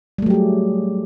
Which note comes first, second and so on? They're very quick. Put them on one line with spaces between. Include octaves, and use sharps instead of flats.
G3 A3 F#3 G4 G#4